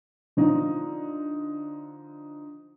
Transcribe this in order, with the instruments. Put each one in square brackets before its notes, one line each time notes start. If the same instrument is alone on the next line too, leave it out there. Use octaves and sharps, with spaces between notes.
[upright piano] D3 F3 D#4